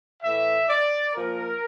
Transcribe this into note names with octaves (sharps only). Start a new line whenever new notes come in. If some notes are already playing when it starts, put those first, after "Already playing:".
A2 E3 E5
D5
A#2 F3 A#4